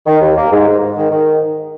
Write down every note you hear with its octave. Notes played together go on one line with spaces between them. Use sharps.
D#3
D#2
A#3
G#2
G#2
G#2
D#3
D#3